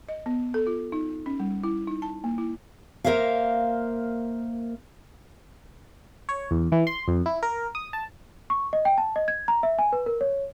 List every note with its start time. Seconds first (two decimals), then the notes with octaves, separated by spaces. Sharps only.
0.09 D#5
0.26 B3
0.54 A4
0.67 F4
0.92 D#4
1.26 C#4
1.40 G3
1.63 E4
1.87 D#4
2.02 A5
2.24 A#3
2.38 E4
3.04 A#3 A#4 C5 E5 F5
6.29 C#5
6.51 E2
6.72 E3
6.87 C6
7.08 F2
7.26 E4
7.43 A#4
7.75 D#6
7.93 A5
8.50 C#6
8.73 D#5
8.85 G5
8.98 A5
9.16 D#5
9.28 G#6
9.48 A#5
9.63 E5
9.79 G#5
9.93 B4
10.06 A#4
10.21 C#5